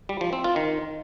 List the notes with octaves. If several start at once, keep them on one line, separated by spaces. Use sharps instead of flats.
G3
F3
C4
F4
D#3